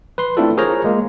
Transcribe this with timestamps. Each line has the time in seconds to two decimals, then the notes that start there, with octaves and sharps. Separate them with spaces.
0.18 B4 C6
0.37 A3 C4 D4 E4 F4 A4
0.57 F4 G#4 A#4 C5 C#5 A#5
0.84 G#3 A#3